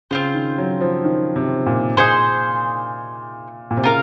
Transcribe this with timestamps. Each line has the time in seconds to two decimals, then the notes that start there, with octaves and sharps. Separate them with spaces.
0.11 C#3 C4 F4 C5
0.35 D#3
0.58 F#3
0.81 F3
1.04 D#3
1.36 C3
1.66 A#2
1.97 A#2 D#4 G#4 C5
3.71 A#2
3.77 C3
3.84 C#3 F4 A#4 F5